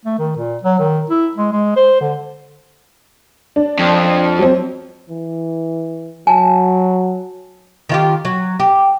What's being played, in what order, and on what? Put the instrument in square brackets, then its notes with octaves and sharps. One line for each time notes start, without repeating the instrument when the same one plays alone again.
[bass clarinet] A3
D#3
A#2
F#3
D#3
E4
G#3
G#3
C5
D3
[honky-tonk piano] D4
[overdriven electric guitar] F2
[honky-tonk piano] F#3 C4
[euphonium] E3
[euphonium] F#3 [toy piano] G#5 A5
[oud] D#3 F4 G4
F#3
G4